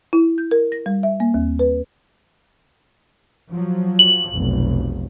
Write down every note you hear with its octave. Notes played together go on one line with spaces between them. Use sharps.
E4
G6
A#4
A#6
G3
E5
A#3
D#2
B4
F3 F#3
F#7
F1 B1